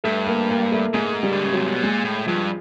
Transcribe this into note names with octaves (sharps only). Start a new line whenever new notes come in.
G2 A3
A#3
A#3
A3
G#2 G#3
G3
D3
C#3
C3 F#3
B2
A#2 G#3
A2
G2 F3